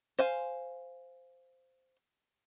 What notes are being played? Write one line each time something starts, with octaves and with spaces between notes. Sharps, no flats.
C5 F5 G#5